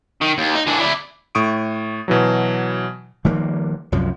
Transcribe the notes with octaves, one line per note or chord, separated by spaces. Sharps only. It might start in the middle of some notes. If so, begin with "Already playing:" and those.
D#3
D#2
D#4
E3 D4
E4 D5
A2 C#6 D#6 D7
B2 E3 F#3
D#3 F3 G3 A#3
C2 F#2 F3